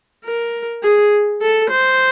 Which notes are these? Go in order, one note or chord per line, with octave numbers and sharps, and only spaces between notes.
A#4
G#4
A4
C5